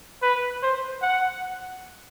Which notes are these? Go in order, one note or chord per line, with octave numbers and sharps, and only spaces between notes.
B4
C5
F#5